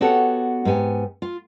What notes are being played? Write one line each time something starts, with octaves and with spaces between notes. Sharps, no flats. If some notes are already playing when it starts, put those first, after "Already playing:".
B3 F#4 G4 A4 C#5 F#5
G#2 B3 G4 G#5
F4